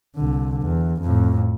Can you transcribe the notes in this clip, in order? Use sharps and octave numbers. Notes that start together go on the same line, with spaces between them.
C2 D3
E2
F2 A2